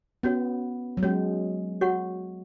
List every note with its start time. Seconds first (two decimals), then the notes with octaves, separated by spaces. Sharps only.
0.23 B3 C#4 F#4 C#5
0.97 F#3
1.03 G#3 C#4 F#4 C#5
1.81 F#4 C#5 F#5 C#6